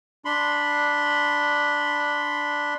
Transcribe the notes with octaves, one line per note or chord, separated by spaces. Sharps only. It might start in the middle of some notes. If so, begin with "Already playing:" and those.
D4 B5 C6